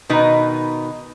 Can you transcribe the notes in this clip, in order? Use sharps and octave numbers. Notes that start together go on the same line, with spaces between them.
B2 D#3 D#4 A#4 B4